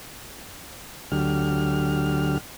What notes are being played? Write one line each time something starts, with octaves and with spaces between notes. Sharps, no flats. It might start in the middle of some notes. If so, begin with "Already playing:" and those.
D2 D3 F#3 G4 F6